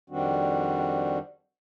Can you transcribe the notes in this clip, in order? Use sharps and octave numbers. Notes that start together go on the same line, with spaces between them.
F2 D#3 G3 C4 D4 F#4